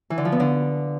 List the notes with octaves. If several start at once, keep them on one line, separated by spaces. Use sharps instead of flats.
E3
D3
F3
B3
D3